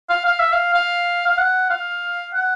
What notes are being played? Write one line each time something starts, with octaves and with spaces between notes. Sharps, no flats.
F5
F5
E5
F5
F5
F5
F#5
F5
F#5